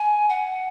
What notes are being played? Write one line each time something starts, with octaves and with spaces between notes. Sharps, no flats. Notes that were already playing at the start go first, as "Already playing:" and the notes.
Already playing: G#5
F#5